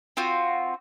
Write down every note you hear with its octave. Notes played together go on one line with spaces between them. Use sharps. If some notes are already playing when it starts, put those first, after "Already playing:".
C4 F4 F#4